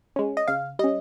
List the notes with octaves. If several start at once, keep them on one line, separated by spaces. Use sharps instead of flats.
G#3 C#4
D#5
C#3 F5
G3 C#4 D#5